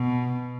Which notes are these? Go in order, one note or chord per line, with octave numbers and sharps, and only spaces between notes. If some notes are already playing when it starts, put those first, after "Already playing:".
Already playing: B2